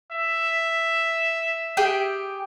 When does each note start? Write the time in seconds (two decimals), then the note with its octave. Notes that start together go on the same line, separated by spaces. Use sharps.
0.12 E5
1.77 G4 G#4 G5